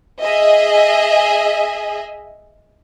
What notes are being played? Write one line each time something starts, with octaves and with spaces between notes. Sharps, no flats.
G#4 D#5 E5